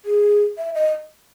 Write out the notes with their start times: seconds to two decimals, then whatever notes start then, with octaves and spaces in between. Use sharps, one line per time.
0.05 G#4
0.58 E5
0.75 D#5